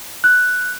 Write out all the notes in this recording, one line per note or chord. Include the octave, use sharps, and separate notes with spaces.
F#6